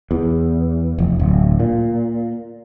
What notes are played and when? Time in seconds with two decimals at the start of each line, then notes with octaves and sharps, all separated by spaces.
0.11 E2
0.98 F1
1.19 D1
1.60 A#2